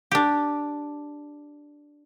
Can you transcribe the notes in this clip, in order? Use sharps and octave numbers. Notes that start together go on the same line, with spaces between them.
D4 G4